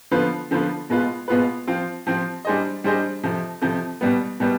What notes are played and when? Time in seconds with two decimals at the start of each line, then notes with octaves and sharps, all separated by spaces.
0.11 D3 F3 B3 F4 B4
0.51 D3 F3 B3 F4 B4
0.90 B2 G#3 B3 F4 B4
1.28 B2 G#3 B3 F4 B4
1.67 F3 C4 F4
2.07 F3 C4 F4
2.45 G3 D4 G#4 C5 D#5
2.84 G3 D4 G#4 C5 D#5
3.23 F2 C3 F3
3.62 F2 C3 F3
4.01 B2 G3 B3
4.40 B2 G3 B3